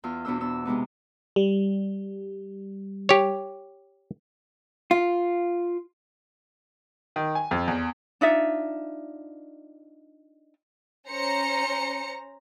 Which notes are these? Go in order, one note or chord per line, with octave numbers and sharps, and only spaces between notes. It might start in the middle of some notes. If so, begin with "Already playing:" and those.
E2 F4 E6 F6
E2 B2 B3 D4 C5 E6
B3 D4 E6
C3 G#3 B3 D#4
G3
G4 C#5
F4
D#3
G#5
F2
E2
D4 D#4 F4 E5
C#4 C5 A#5 C#7